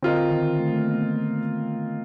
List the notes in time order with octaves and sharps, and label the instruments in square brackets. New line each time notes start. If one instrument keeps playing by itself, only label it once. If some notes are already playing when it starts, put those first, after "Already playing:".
[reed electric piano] D3 [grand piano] C4 F4 A#4 D#5
[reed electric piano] D#3
A3
A3
A#3
B3